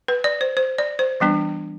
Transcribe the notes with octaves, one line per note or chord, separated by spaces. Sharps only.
B4
D5
C5
C5
D5
C5
E3 G3 B3 D4